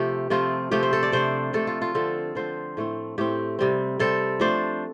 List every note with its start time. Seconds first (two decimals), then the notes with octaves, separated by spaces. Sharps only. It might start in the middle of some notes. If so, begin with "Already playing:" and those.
Already playing: C3 F3 A3 F4 G4
0.30 C3 F3 A3 C4 F4
0.71 C3 F3 A3 C4 G4
0.83 C5
0.93 A4
1.03 D5
1.12 C3 A3 D4 C5
1.53 C3 A3 D4 A4
1.67 F4
1.82 F4
1.95 D3 F3 C4 A4
2.35 D3 F3 C4 C5
2.77 A2 A3 C4
3.18 A2 A3 C4 G4
3.59 C3 G3 C4
3.99 C3 G3 C4 A4
4.40 F3 A3 D4 C5